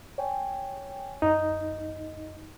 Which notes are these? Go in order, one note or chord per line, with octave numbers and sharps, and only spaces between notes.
C#5 G5 G#5
F#2 D#4